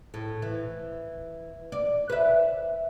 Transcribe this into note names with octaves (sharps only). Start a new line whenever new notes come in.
A2
E3
D5
B4 E5